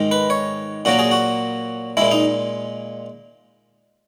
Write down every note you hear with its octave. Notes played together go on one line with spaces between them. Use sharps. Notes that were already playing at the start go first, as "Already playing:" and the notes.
Already playing: G#2 D#3 G#3
B4
C#5
A#2 F#3 A#3 F#4
G#4
F#4
A#2 G#3 E4
D#4